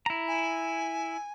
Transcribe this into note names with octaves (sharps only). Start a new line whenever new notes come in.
E4 A#5
G#5